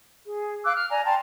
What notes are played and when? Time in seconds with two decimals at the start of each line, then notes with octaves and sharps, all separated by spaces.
0.24 G#4
0.64 F5 D6 E6 F#6
0.77 F6
0.90 D5 G#5 A#5
1.04 G5 A5 A#5 C6